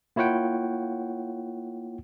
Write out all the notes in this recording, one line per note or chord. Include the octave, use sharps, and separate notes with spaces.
A#3 E4 F4 C#5 F#5 G5